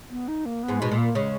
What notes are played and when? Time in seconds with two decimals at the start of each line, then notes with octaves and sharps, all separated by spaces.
0.10 B3
0.28 D#4
0.46 A#3
0.63 B3
0.68 G#2
0.80 B2 G#3
0.92 A#2
0.98 A#3
1.15 C#3 G#3